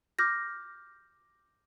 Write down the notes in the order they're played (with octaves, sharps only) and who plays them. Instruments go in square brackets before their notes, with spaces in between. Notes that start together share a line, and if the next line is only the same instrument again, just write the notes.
[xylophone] D6 F6 G6 A#6